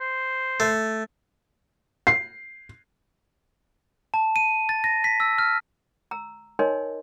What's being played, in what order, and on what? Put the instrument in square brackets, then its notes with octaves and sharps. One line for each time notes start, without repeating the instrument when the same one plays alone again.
[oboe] C5
[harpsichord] A3
[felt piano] C7
[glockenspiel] A5
D#7
A6
A#6
B6
E6
F6
[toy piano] A#5 E6
D#4 A#4 C#5 D#5 G#5 C6